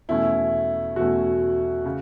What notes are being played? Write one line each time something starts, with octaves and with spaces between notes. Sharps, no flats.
E2 B2 A3 C#4 E4
E2 B2 A3 C#4 F#4
C#3